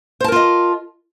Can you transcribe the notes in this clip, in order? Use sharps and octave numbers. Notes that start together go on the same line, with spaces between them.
F4 A#4 C5 D#5 A5